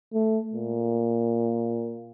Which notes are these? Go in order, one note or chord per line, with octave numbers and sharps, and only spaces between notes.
A3
A#2